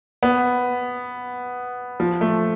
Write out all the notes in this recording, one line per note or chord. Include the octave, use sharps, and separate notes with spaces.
B3
F3
A3